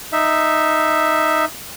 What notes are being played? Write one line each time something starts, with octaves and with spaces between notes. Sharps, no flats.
D#4 E5